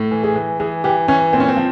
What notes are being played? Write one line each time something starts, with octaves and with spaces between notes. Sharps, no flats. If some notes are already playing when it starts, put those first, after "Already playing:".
Already playing: A2
E3
G#4
E3
E3 G#4
E3 G4
E3 C#4
A#2 C4
C#4
C4
F3